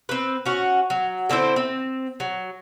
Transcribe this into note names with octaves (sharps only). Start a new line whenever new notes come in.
C4 B4
C#4 F#4
F#3
D3 C4 E4 C5
C4
F#3